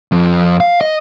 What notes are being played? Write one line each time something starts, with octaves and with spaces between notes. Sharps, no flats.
F2
F5
D#5